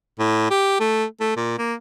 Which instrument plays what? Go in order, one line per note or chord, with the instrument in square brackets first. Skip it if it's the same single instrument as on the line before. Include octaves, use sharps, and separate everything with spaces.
[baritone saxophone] A2
G4
A3
A3
A#2
A#3